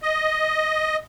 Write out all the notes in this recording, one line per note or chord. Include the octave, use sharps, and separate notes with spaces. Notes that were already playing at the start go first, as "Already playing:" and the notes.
D#5